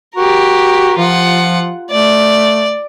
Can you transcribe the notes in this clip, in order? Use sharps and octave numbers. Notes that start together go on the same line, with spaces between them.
F#4 G4 A#4
F3 F4 F#5
A3 D5